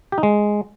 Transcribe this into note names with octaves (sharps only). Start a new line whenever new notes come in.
G4
D#4
G#3